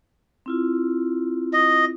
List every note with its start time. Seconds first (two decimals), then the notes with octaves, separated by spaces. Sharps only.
0.46 C4 E4 F4
1.53 D#5